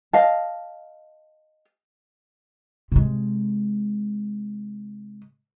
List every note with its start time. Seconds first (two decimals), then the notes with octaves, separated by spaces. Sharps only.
0.13 D#5 F5 A5
2.92 C3 G#3